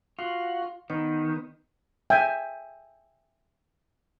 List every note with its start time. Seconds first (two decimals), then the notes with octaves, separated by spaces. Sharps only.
0.19 F4 F#4
0.90 D#3 B3 D#4
2.10 E5 G5 G#5